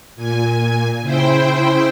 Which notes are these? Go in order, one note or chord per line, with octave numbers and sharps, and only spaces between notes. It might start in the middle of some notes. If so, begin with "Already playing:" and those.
A#2 G#5
C#3 E4 C5 G5